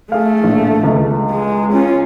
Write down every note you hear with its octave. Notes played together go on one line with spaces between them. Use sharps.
A3 G#4 F5
A#1 A2
C#2
G#3
C#4 F4